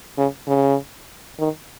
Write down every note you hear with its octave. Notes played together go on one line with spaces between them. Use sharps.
C#3
C#3
D#3